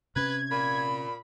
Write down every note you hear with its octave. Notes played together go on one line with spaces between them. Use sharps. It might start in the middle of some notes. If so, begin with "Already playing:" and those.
C3 C#4 B4 G#6
A#2 B5